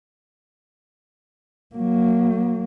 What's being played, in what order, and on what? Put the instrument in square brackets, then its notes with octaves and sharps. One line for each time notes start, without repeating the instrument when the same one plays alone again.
[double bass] F#3 A#3